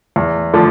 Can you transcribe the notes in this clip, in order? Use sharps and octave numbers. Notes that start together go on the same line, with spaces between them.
E2
D3 F3 A3